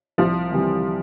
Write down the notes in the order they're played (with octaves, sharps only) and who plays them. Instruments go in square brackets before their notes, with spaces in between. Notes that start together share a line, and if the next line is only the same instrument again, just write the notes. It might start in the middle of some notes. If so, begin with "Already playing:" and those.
[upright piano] C2 [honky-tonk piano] F3
[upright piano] C3 E3 G3